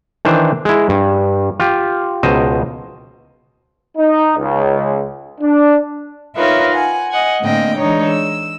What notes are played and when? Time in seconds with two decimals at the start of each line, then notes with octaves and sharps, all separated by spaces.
0.25 D#3 E3 D4 C5
0.65 G#3 E4
0.89 G2
1.60 F4 G4
2.23 C#2 B2 C5 D#5
3.98 D#4
4.37 C#2
5.41 D4
6.36 D#4 F4 A#4 B4 C#5 E5
6.75 F#5 G#5
7.10 D#5 F#5 G#5
7.41 A2 D3 A#3 C4 D#5 G5
7.77 E3 G#3 D4 D#4 C#5
8.07 E6